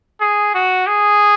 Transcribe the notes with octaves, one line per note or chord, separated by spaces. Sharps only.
G#4
F#4
G#4